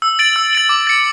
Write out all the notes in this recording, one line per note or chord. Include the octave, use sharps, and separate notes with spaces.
E6
A6 D7 F#7
E6
A6 D7 F#7
D6
A6 C#7